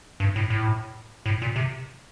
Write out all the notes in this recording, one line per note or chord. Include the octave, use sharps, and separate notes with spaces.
G2
A2
A2
A2
A#2
C3